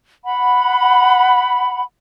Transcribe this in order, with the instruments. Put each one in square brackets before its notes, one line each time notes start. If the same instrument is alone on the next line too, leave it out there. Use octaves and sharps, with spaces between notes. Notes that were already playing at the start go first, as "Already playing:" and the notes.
[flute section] F#5 B5